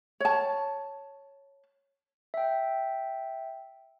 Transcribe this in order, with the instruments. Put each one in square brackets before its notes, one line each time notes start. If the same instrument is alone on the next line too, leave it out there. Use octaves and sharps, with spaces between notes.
[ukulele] C#5 A5
[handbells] E5 G5